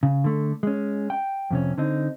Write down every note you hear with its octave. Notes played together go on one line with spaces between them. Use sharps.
C#3
D3 A3
G#3 C#4
G5
F2 C3 C#4
D3 C4 D#4